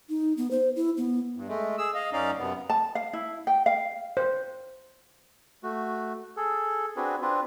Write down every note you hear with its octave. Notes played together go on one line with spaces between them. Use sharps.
D#4
B3
C5
E4
B3
G2
G#3 A3
G#4 E6
D#5 F5
F#2 C#4 D#4 D5 F5
F#2 C3 B3
A5
F5
E4
G5
F5
C5
A3 F#4
G#4 A4
C4 D4 F#4 G#4 B4
C4 D4 F4 B4